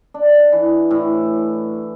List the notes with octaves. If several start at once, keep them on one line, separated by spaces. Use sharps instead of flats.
D4
E3
A2